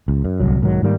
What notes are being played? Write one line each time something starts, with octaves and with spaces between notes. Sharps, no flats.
C#2
F#2
D1 G1 C2 F#3
B1 G#2 D#3 F#3
G#2 D#3 G3 A#3